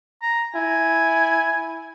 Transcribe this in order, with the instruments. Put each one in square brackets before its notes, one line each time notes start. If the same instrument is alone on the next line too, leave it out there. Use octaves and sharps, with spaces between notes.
[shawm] A#5
[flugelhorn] E4 [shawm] G#5